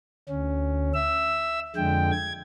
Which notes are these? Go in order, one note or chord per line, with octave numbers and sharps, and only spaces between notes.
D2 C#4
E5 E6
F2 D3 G#3 G5
G#6